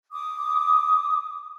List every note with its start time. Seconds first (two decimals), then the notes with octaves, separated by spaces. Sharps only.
0.13 D6 D#6